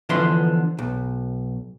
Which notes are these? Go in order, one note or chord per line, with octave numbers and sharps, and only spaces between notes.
D3 E3 F3 B3 E5 C6
B1